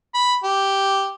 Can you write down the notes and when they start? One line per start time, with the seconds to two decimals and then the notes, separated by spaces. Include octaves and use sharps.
0.14 B5
0.43 G4